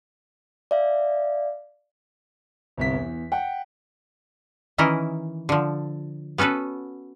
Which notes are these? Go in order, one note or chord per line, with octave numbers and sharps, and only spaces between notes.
D5 E5 F5
G1 C2 B6
E2
F#5 G5
D#3 E3 C#4 E4 A#4 D#5
D3 F3
B3 C#4 F#4 A4 B4